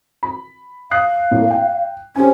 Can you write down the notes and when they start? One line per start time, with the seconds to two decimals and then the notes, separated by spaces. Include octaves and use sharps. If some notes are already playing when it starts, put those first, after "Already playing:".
0.23 B5
0.91 F5 D#6 F#6 C7
1.31 A2 A#3
1.50 G5
2.16 C#4 G4 C5 G#5